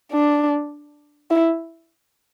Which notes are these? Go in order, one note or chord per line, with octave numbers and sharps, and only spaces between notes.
D4
E4